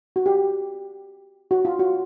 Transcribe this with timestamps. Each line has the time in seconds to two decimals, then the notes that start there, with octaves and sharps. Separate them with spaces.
0.16 F#4
0.26 G4
1.51 F#4
1.65 F4
1.79 F#4